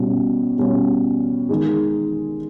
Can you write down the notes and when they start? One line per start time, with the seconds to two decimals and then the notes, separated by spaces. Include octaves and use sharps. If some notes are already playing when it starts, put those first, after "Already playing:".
Already playing: B2 G3 C#4
0.58 B2 G3 C#4
1.49 D#3 G#3 D#4 G#4